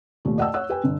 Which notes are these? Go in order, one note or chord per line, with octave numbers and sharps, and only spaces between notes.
D#2 A#2 A3
D5 D#5 F#5 G5 A5 E6
C#5 F#5 E6 F#6
G4 B4 G5 G#5
G1